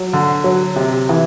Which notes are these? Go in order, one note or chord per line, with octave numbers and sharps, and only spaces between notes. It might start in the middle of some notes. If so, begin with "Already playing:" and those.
Already playing: F#3
D3
F#3
C3
E3